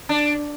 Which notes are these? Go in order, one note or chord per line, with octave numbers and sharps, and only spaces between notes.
D4